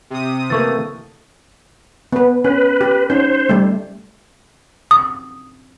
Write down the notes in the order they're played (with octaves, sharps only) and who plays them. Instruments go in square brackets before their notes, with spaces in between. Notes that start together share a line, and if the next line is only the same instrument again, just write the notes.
[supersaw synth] C3 D#6
[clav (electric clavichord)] E3 A3 A#3 [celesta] A4 C#6 A6
[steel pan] B3 B4
[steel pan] C#4 [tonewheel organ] B4
[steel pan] G4
[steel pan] C#4 D#4 [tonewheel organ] C5
[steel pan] G3 A3
[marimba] D#6